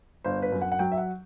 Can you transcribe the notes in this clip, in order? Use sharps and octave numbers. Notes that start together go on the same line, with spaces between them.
G1 C5
B4
F#2
F#5
F#5
F#3 G5
E5
F#5